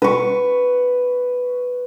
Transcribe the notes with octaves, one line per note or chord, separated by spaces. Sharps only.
B4 C#6